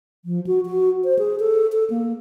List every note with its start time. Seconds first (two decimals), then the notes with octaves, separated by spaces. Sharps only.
0.25 F3
0.47 F#4
0.66 F#4
1.04 C5
1.19 G#4
1.40 A4
1.72 A4
1.90 A#3